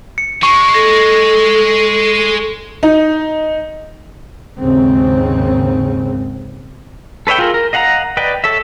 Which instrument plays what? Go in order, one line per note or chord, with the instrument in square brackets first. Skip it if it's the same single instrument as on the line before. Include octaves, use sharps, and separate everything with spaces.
[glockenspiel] C#7
[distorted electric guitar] G#3 [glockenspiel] C#6
[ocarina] A4 [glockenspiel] A#6
[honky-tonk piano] D#4
[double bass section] D#2 G#2 C#3 C4
[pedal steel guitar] A4 B4 C#5 E5 G5
F4 G#4 A#4
A#4
D#5 F5 F#5 A5 A#5
B4 D5 D#5 G5
A4 C#5 E5